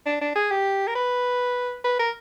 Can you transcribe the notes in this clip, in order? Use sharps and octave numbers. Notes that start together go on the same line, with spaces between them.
D4
D4
G#4
G4
A#4
B4
B4
A#4